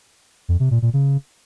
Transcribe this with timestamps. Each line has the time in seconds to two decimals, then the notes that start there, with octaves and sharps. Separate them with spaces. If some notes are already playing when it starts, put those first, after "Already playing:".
0.49 F2
0.60 C3
0.71 A#2
0.82 A#2
0.93 C#3